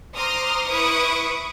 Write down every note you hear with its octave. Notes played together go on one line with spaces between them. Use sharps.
C5 A#5 C6 D6 D#6 F6
E4 B4 C#6 D#6 D7